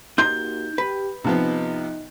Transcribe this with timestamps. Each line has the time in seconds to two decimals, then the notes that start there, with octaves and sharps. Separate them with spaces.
0.18 A#3 D#4 F#4 G4 C6 G6
0.78 G4 B4
1.24 C3 F3 B3 D#4